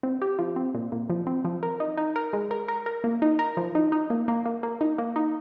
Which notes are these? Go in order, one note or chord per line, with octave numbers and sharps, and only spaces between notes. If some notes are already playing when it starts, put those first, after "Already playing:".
C4
G4
F3
C4
A#2
A#2
F3
C4
F3
A#4
D#4
D#4
A#4
G#3
A#4
A#4
A#4
A#3
D#4
A#4
F3
D#4
D#4
A#3
A#3
A#3
A#3
D#4
A#3
D#4